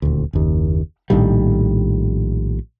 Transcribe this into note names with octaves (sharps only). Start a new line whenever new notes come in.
D#1 D2
F#1 D#2
A#1 A2 D#3 G3